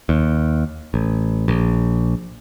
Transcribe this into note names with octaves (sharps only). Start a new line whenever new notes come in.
D#2
A1
A#1